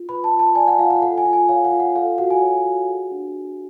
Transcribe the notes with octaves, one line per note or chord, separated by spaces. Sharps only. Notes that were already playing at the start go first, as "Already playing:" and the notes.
Already playing: F4
B4 B5
A5
F4
A5
D5 G#5
F#5
F4 F5
F#5
A4 F#5
G#5
F4
G#5
C#5 F5
F#5
F4
F#5
A4 F5
F#4 F#5
G#5
C#5
F#4
G#4
D4